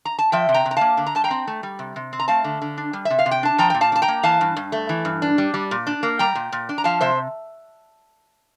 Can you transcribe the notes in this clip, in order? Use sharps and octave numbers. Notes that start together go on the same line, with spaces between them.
A#5
A5
F3 E5 G5
C3
G5 A#5
C3
A#5
A#3 F5 A5
D3
A#5
G2 A5
G5 A#5
C4
A3
G3
C3
C3
C4
A#5
A3 F5 A5
D3
D3
D4
G3
E5
C3
F5
C3
G5
D4 A5
F3 G5 A#5
A#2 G5
F5 A5
D4
A5
G5 A#5
A#3
E3 F5 A5
G2
G2
A3
E3
G2
D4
G3
G3
A#2
D4
A#3
G3 G5 A#5
A#2
A#2
D4
A#5
F3 F5 A5
C3 C5 E5